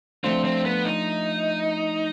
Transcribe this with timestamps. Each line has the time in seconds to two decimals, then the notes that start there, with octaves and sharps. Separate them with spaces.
0.24 F3 A3 C4 D4 F4
0.45 C4
0.65 B3
0.85 D#4